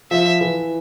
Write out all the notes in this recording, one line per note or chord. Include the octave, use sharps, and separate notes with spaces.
F3 E5
E3